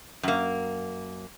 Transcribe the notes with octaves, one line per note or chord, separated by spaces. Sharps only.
F#2 A#3